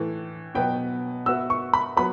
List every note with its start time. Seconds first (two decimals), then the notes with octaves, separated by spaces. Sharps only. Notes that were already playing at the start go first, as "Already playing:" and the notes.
Already playing: A2 E3 A3
0.55 B2 F#3 B3 G5
1.26 B3 F#4 B4 E5 E6
1.50 C#6
1.74 B5
1.97 F#3 B3 B5